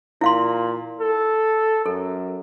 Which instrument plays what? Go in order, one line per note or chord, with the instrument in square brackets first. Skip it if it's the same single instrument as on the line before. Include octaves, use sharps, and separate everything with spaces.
[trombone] A#2 [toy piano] E4 F5 C6
[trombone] A4
[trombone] F#2 [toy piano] A4